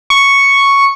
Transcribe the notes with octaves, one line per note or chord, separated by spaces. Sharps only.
C#6